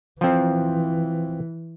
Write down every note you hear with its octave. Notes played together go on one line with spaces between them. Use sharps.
E3 F3 C4